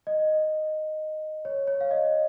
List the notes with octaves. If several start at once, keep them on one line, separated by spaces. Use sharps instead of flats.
D#5
C#5
C#5
F5
D#5